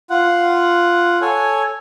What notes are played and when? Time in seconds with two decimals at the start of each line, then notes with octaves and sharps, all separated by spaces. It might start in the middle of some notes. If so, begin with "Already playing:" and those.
0.10 F4 F#5
1.21 A4 C#5 G#5